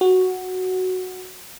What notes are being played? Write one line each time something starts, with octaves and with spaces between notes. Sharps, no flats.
F#4